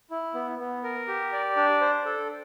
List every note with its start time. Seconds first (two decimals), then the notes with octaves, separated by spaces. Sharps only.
0.11 E4
0.34 B3
0.59 B3
0.84 A#4
1.08 G4
1.33 D5
1.57 D4
1.81 C5
2.05 A4